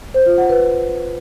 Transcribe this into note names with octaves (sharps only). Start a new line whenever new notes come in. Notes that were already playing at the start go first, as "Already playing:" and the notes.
C5
F4
F#5
B4